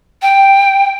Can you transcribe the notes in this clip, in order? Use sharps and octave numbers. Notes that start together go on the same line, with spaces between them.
G5